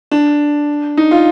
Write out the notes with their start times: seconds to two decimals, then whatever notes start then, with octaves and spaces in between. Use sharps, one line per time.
0.11 D4
0.97 D#4
1.11 F4